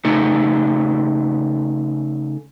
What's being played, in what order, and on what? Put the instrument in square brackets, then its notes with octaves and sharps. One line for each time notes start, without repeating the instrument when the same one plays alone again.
[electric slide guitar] C#3 A3 D#4 A4